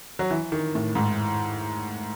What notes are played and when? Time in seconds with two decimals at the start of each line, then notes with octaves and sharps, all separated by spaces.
0.19 F#3
0.31 E3
0.52 D#3
0.75 A2
0.95 G#2